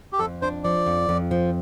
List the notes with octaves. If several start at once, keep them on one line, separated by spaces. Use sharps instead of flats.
G4
F2 A4
D4 C5
F3 D5
F2
F2
F3